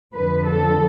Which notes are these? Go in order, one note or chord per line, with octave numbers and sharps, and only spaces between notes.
F2 D3 F3 B4
A4